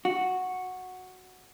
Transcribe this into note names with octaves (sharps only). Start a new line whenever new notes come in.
F#4